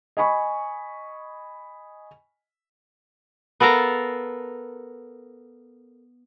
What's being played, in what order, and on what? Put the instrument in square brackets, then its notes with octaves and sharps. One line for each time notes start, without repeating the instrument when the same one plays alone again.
[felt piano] D#5 G#5 B5 C#6
[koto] B3 A4 A#4 F5 A#5